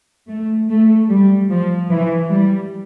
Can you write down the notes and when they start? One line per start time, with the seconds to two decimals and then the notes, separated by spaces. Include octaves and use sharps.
0.29 A3
0.70 A3
1.10 G3
1.51 F3
1.90 E3
2.30 G3